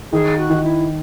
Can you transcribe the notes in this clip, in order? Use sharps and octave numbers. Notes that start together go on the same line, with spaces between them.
D#3 G#4
F#4
D#3
E4